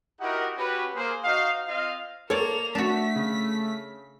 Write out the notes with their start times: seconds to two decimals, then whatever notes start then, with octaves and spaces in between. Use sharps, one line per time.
0.21 D#4 E4 F#4 G4 A#4 F#5
0.57 C#4 F#4 G4 B4
0.95 A#3 G#4 C5
1.24 D#4 F#4 C5 D#5 F5
1.68 C4 F4 D#5 F5
2.30 A#3 A4 C#5 D5 F7
2.75 A3 D4 F#4 B6
3.16 C#3